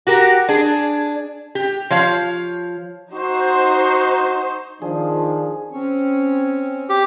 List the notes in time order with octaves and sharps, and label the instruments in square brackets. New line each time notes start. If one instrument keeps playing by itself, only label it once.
[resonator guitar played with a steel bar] F#4 G4 A#4
D4 G#4
G4
F3 C#5 F5
[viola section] D#4 C5 [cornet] F#4
[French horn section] D#3 [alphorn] F3 [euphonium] D4 [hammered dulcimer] G#4
[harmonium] C4 C#4 C#5
[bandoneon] G4